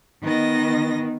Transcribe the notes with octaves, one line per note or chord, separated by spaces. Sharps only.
D#3 B3 D#5 A#6